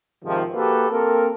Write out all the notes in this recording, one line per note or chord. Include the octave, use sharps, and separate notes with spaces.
G#2 C3 D#3 F3
A#3 F#4 G4 A4 B4
A#3 C4 A4 A#4